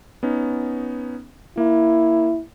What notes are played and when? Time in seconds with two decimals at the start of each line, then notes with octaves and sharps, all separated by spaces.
0.23 B3 C#4 D#4
1.57 A#3 E4